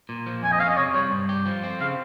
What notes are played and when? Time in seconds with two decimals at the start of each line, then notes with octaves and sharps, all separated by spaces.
0.09 A#2
0.26 F3
0.43 F2 G#5
0.52 D#5
0.60 C#4 F5
0.69 D#5
0.77 C3 C#5
0.94 G3 C#5
1.12 G2
1.29 G4
1.46 F3
1.63 C4
1.80 C#3 F5